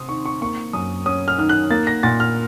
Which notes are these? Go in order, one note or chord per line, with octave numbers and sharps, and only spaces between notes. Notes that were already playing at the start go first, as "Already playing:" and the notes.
Already playing: C3 C4 C6 D#6
D#3 C#6
C#6
A#3 C#6
F#2 D#6
C#4 D#6
F6
D#3 F6
F#6
A#3 A6
A#6
A#2 A6
F6